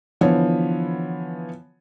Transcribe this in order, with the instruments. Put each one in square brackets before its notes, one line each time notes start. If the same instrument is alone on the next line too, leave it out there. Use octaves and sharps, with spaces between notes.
[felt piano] D3 E3 F3 B3 C#5